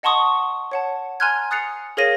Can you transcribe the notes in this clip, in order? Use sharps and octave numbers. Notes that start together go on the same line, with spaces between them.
D#5 F#5 A5 C6 C#6 D#6
C#5 F#5 A5
G#5 A#5 C6 F6 F#6 G#6
D#6 F#6 A6 C7 C#7 F7
G#4 A#4 C#5 F5 A#6 D#7